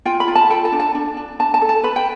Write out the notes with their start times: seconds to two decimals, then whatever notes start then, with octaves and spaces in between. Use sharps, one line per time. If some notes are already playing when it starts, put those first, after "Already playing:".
0.05 F4 G5
0.20 B5
0.28 F4
0.35 A5
0.50 A4 G5
0.65 A5
0.72 D4
0.80 A5
0.95 D4
1.17 D4
1.39 D4 A5
1.54 A5
1.62 A4
1.69 A5
1.83 B4 B5
1.96 G5